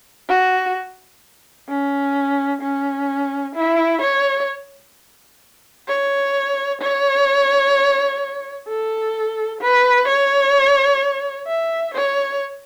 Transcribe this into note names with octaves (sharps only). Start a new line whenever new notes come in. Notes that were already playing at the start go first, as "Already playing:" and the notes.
F#4
C#4
C#4
E4
C#5
C#5
C#5
A4
B4
C#5
E5
C#5